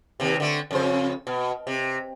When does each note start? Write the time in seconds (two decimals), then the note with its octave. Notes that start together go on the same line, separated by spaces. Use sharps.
0.20 D#2 C3
0.40 D3 A3
0.71 F2 C#3 C5
1.27 B2
1.67 C3